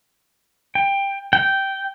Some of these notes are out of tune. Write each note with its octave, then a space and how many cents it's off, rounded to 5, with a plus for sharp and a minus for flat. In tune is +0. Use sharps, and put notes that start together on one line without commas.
G5 +15
G5 -10